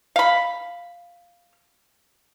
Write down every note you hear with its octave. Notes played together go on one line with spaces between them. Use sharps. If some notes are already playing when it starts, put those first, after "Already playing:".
F5 B5